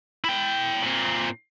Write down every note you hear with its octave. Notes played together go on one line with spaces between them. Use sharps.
E4 G5
A#2 C4